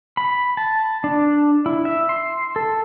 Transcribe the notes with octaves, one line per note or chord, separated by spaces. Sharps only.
B5
A5
D4
E4
E5
C6
A4